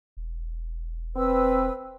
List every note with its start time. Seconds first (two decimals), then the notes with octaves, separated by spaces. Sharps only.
0.17 E1
1.16 C4 B4 E6